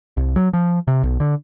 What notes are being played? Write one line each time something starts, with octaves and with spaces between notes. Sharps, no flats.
C2
F#3
F3
C3
B1
D3